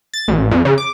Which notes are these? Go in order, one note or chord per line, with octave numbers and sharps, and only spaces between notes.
A6
A1
F2
C#3
D6